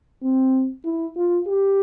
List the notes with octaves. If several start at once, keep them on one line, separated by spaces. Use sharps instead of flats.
C4
E4
F4
G4